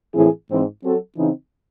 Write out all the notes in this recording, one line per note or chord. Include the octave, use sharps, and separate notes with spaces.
A2 E3 C4 E4 G#4
G#2 E3 C4
F#3 C4 F#4 A4
C#3 E3 C4 D#4